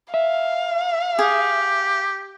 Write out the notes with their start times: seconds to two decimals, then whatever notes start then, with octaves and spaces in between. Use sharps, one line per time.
0.14 E5 F5
1.19 G4 G#4